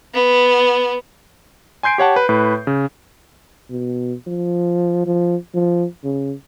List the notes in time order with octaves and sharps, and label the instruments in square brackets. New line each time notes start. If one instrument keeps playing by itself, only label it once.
[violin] B3
[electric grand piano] G#5 C6 G6 C7 D7
G4 C#5 F#5 A5
B4
A2 B4
C#3
[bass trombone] B2
F3
F3
F3
C#3